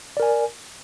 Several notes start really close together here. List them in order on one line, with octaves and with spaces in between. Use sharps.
D5 A#4 G#5